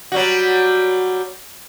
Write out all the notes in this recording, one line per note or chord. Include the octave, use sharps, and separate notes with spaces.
F#3 G3 F#4